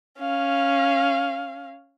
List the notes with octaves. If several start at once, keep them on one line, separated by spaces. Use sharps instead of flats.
C#4 F5